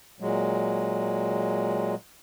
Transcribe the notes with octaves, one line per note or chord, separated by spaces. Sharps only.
A#2 F#3 G#3